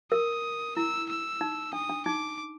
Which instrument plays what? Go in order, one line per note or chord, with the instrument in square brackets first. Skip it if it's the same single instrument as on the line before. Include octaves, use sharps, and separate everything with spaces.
[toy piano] A#4 [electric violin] D#6
[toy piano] E4 [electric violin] E6
[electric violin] E6
[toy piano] D#4
[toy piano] D4 [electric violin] D#6
[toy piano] D4
[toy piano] D#4 [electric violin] D6